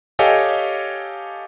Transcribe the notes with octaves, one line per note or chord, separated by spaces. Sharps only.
G4 A4 C#5 D#5 F5 G#5